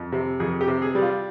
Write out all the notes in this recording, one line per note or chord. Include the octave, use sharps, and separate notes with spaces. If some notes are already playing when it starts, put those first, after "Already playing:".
Already playing: F2
C3
F2 G#4
G4
C3
G#4
G3
F4